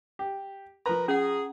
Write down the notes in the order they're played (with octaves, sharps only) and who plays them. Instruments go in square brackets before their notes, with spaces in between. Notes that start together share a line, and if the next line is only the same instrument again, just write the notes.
[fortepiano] G4
[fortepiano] F3 A#5 [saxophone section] A#4 B4
[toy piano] C#4 F#5 [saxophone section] G#4